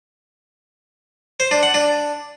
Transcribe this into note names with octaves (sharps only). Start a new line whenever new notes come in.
C5
D4
F#5
D4